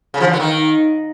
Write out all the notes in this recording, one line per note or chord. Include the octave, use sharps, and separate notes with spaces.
C#3
F3
D3
B3
D#3